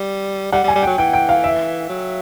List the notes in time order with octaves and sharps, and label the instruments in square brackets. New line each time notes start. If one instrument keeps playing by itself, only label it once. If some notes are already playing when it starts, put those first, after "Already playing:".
Already playing: [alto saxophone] G3
[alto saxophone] G3 [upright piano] F#5
[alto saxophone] G3
[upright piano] G#5
[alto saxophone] G3
[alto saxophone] F#3 [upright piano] G5
[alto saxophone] E3 [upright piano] G5
[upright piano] G5
F5
E5
[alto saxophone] F#3